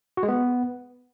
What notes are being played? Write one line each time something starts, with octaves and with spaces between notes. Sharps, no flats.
F#4
G#3
B3